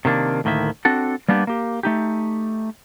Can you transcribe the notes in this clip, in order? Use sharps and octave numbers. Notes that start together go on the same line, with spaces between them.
C3 D#3 A#3 D4
D2 A2 D#3 A#3 E5
C4 D4 F#4 A4
G3 A#3 B3 D4 G4
A#3 G4
A3 D#4 G4